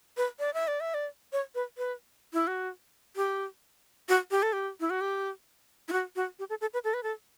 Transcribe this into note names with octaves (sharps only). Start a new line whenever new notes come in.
B4
D5
E5
D5
E5
D5
C#5
B4
B4
E4
F#4
G4
F#4
G4
A4
G4
E4
F#4
G4
E4
F#4
F#4
G4
A4
A4
B4
A4
B4
A4